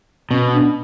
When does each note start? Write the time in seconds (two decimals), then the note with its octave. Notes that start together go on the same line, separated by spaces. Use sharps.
0.31 B2 C#4
0.52 D4